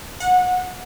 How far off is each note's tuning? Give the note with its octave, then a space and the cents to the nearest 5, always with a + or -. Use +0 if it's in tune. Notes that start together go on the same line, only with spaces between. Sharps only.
F#5 -25